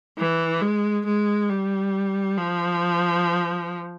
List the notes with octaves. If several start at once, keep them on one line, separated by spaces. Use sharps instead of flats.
E3
G#3
G#3
G3
F3